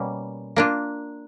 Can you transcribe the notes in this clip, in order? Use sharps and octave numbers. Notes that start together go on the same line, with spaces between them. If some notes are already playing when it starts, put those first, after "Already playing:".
Already playing: B2 G3 A#3 C#4
A#3 D4 F4